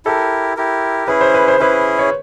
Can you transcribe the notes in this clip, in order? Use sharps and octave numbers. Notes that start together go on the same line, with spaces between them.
E4 G4 A4 A#4
E4 G4 A#4
C#4 E4 G#4 B4
C5
B4
C5
C#4 E4 G#4 B4
C#5